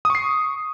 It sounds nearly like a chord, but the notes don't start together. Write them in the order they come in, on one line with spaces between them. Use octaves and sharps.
D#6 C#6 C7